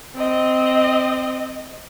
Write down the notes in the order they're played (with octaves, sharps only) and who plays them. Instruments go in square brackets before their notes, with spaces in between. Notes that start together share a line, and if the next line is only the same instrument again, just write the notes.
[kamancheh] C4 D#5